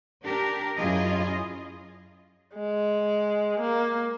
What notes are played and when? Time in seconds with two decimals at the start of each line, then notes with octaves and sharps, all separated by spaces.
0.22 D4 G4 A#4
0.78 F#2 E4 F4 G#4 D#5
2.54 G#3
3.60 A#3